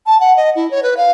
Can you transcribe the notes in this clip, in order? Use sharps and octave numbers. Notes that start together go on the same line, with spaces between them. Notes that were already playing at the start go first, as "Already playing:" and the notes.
A5
F#5
D#5
E4
C#5
B4
F5